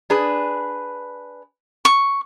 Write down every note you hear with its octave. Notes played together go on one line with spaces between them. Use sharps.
D4 G#4 B4
C#6